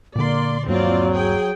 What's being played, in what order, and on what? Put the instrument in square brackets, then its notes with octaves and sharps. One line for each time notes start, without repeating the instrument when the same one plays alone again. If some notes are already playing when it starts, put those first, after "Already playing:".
[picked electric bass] A#2 D3 [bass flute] A#3 [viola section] D5 C6
[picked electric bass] D#1 G2 A#3 [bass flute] F#3 [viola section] C4 F4 D5
[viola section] G#4 G5